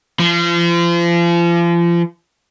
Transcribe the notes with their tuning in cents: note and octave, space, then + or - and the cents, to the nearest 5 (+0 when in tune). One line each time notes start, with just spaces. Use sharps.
F3 -35